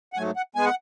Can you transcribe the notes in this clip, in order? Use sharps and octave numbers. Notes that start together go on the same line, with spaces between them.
F#5
G#2 F#3 A3 G#5
F#5
G#2 G#3 B3 G#5
F#5